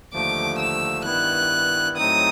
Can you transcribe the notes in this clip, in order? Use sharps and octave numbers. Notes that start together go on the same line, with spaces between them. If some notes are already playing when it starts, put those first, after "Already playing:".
D#2 D3 F3 A3 D6
E6
G2 D#3 G3 B3 E4 F#6
A2 F#3 A3 C4 D#4 D#6